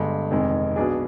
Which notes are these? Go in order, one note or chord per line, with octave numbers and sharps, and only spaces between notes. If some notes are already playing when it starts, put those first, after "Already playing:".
Already playing: G1 G2 D3 G#3
F1 F2 D#3 G#3
B1 B2 B3 D4 G#4